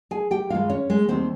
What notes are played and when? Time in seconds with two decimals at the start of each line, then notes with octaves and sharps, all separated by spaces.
0.11 G#4 G#5
0.31 G4 G5
0.50 G2 D#3 G#3 F4 F5
0.69 C#4 C#5
0.90 G#3 G#4
1.08 D#2 D#3 G3 C4 C5